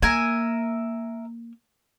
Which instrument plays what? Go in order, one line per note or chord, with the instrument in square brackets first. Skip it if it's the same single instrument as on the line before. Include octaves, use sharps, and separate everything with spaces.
[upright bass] A#3 [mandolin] A#4 E5 G#5